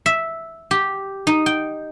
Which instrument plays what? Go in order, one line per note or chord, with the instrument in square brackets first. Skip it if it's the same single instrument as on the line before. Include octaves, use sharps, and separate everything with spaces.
[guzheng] E5
G4
D#4
G5